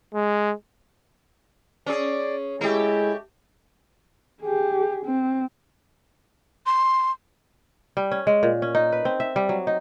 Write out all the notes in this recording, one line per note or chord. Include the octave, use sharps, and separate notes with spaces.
G#3
C#4 G#4 D5
G#3 A3 E4 G4
G4 G#4
C4
C6
G3
C#4
G#3
A#2
C#4
D#4
B4
C4
E5
G3
F#3
D#4